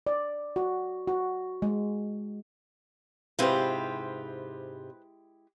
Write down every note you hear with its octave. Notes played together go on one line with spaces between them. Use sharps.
D5
F#4
F#4
G#3
G#2 C3 G#3 E4 F4 G4 B4 C5